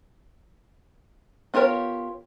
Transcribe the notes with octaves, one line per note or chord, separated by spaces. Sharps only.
B3 F4 G4 A#4 C#5